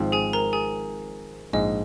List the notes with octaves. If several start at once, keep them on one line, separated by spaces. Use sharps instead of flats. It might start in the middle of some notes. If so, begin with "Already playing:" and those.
Already playing: G#1 G#2 F3 C4
G#4 G#5
A#4 A#5
G#4 G#5
A#1 G#2 G#3 D#5